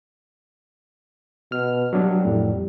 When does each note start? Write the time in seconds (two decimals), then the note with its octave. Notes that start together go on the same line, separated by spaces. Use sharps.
1.52 B2 F6
1.93 F#3 G3 D4
2.25 F2 A2